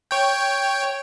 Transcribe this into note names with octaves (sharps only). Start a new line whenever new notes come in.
C#5 G5